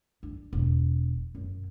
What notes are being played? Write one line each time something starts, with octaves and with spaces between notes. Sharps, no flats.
D4
E1
F#2